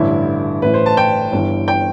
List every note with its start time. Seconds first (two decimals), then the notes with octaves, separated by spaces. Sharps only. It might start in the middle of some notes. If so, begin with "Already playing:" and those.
Already playing: A1 G2 D3 E4
0.62 A1 A2 E3 B4
0.74 C5
0.86 A5
0.97 G5
1.32 G1 G2 E3
1.68 G5